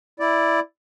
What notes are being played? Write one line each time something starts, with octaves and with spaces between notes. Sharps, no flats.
E4 D5